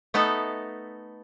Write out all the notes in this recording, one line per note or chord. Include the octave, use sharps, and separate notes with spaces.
A3 B3 D#4 A4